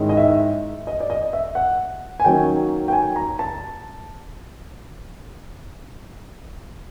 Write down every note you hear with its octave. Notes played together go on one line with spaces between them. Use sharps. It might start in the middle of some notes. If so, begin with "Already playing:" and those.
Already playing: G#2 D#3 G#3 C#4 E4
D#5
E5
D#5
D5
D#5
E5
F#5
G#5
D#3 F#3 A#3 C#4 G5
G5
G#5
A#5
A5